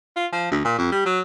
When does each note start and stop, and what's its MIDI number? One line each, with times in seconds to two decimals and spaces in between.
0.16 0.26 65
0.33 0.48 53
0.51 0.60 38
0.65 0.77 46
0.78 0.89 41
0.92 1.04 55
1.05 1.21 54